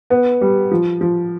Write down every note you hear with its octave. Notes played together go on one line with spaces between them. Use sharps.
B3
G3
F3
F3